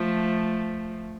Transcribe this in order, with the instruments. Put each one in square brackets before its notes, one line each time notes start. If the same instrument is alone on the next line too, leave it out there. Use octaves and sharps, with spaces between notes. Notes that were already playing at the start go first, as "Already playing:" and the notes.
Already playing: [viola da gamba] F3 A3